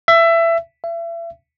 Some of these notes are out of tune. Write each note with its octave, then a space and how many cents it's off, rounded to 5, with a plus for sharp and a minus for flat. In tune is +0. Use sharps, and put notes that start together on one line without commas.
E5 +20
E5 +35